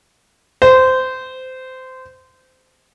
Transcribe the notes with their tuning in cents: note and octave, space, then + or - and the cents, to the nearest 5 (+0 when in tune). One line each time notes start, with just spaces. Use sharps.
C5 -20